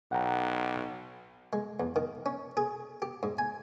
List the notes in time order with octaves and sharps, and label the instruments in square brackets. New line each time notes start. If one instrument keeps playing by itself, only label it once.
[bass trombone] B1 [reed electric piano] F#5 G5 A#5
[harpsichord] G#3
E2
D#3
C#4
G#4
G4
G#2
G#5